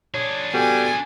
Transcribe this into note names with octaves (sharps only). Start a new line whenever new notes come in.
D4 G#4 C#5
G3 B3 F#4 A4 G#5